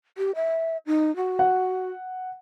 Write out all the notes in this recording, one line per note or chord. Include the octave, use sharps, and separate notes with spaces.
G4
E5
D#4
F#4
F#5